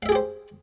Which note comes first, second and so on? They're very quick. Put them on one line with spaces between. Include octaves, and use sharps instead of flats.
F5 E5 G#4 G4 C5